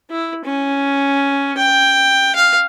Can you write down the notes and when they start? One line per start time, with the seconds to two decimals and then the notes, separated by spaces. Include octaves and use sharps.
0.10 E4
0.44 C#4
1.57 G5
2.35 F5